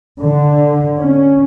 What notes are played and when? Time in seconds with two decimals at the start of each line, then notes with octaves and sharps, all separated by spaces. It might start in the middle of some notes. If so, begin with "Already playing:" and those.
0.21 D3
1.01 C#4